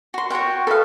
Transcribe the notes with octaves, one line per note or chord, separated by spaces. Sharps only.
F#4 C6
F#4 C#5 F#5 G5
A4 B4 D#5 F5